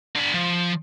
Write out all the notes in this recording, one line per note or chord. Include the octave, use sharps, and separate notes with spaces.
D3 B5
F3